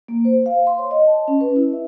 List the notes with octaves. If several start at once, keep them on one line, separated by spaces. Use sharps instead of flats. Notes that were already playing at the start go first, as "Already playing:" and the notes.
A#3
C5
F5
C6
C#5
D#5
A5
C#4
B4
E4
E5